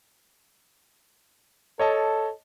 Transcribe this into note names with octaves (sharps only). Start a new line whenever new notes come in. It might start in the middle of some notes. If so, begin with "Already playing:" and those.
A4 C#5 D#5 A5